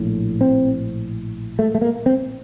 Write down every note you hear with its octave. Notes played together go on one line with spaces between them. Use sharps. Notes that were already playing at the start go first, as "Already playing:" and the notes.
Already playing: A#1 A2
C4
A3
A3
A#3
C4